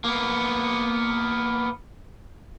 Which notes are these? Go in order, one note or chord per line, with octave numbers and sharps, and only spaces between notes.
A#3 B3